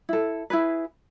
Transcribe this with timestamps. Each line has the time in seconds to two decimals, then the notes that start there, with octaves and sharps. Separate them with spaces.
0.09 E4 A4
0.50 E4 G#4 B4